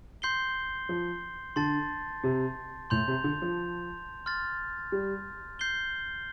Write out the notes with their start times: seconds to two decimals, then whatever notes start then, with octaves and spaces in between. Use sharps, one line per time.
0.22 C6 G6 C7 G7
0.89 F3
1.56 D3 A5 C6 A6
2.23 C3
2.90 A2 C6 G6 F7
3.08 C3
3.24 D3
3.42 F3
4.26 C6 F6 A6
4.92 G3
5.59 G6 C7 G7